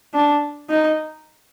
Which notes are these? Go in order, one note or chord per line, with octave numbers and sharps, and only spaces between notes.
D4
D#4